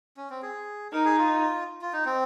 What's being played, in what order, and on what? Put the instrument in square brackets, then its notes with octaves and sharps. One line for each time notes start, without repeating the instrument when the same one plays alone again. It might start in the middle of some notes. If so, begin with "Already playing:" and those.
[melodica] C#4
C4
G#4
[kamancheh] D#4 [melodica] A#4
[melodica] G#4
F4
F4
D#4
C4